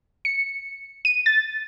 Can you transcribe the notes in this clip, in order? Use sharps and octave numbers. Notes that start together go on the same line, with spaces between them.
C#7
D#7
A6